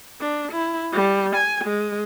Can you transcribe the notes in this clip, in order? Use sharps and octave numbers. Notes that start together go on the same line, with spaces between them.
D4
E4
G3
G#5
G#3